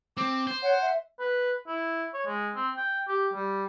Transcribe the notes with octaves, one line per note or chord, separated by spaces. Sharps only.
C4 D6
C5
C#5 F#5
E5
B4
E4
C#5
G#3
C4
G5
G4
G3